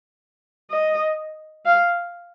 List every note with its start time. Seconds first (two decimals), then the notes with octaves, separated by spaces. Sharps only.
0.71 D#5
1.65 F5